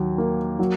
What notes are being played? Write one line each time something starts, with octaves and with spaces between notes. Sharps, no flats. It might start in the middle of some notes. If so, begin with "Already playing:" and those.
Already playing: D#2 F#3
A#3
F#3